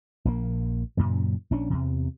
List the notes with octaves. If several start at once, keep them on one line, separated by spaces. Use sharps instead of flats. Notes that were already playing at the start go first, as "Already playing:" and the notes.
A#1 E3 A#3
F#2 A#2 C#3
A#1 C#4 D4
E2 C3